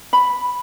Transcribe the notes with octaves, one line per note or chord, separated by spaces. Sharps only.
B5